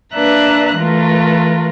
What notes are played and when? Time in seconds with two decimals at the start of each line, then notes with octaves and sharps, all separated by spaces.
0.14 A#3 D4 B4 E5 A#5 F#6
0.77 E3 A3 F4 A#4 B4